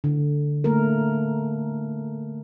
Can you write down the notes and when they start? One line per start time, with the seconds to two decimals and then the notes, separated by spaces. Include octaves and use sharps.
0.04 D3
0.64 A3 A#3 A#4